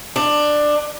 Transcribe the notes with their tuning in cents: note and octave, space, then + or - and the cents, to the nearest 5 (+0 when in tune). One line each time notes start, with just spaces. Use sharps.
D4 +15